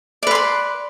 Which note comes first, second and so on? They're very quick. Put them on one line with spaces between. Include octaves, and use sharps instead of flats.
D5 B4 C6 B5